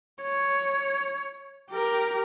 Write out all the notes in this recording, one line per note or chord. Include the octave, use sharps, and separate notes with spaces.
C#5
G4 A#4